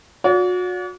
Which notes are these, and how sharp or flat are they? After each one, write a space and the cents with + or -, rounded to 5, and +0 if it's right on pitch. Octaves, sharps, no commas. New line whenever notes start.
F#4 -35 D5 -45